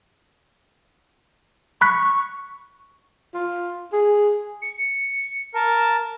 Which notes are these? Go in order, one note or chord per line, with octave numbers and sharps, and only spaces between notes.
B5 C#6 F#6 B6
F4
G#4
C#7
A#4 A5